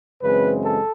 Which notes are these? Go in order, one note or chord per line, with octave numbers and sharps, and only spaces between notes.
F#2 C#3 E3 G#3 C4 B4
A4